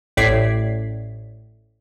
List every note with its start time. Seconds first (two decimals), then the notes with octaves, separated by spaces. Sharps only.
0.17 A1 A2 D5 G#6 B6 C7